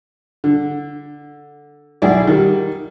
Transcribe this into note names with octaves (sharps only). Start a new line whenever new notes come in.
D3
B1 E4 G#4 D5
D#3 G3